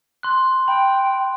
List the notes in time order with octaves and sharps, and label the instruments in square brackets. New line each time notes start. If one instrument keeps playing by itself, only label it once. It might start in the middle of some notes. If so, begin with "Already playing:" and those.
[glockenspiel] C6 F#6
[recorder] G5 [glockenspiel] B5